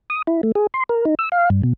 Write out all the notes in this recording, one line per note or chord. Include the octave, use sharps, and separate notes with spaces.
D#6
E4
A3
G#4
C6
A#4
D#4
E6
F5
G2
B2